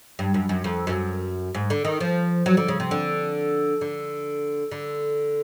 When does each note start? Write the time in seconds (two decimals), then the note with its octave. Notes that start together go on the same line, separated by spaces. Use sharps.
0.19 G2
0.34 F#2
0.49 F#2
0.64 F2
0.87 F#2
1.55 G#2
1.70 D3
1.85 D#3
2.00 F3
2.46 F#3
2.57 D3
2.68 C#3
2.80 C3
2.91 D3
3.81 D3
4.72 D3